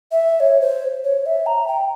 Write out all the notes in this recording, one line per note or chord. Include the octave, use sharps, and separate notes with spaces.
E5
C#5
C5
C#5
E5
A#5
G5